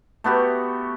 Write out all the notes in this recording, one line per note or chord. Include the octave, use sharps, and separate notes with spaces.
A3 B3 F#4 G4